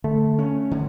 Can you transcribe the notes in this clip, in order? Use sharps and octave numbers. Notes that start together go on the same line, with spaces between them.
D3 A3
C#4
D3